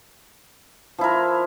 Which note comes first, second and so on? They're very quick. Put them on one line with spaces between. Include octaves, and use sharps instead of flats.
F3 E4 A#4